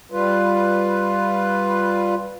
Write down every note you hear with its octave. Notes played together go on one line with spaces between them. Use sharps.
G3 F4 B4